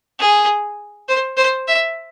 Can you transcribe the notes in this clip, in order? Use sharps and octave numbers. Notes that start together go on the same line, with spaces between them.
G#4
C5
C5
E5